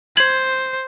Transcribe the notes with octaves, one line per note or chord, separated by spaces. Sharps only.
C5 G#6 F#7